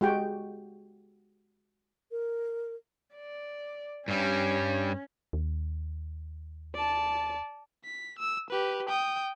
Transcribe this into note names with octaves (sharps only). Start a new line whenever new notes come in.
G#3 F#4 G4 G5
A#4
D5
G2 G3 C#4
D#2
D5 A5
B6
E6
G4 B4
G5 D#6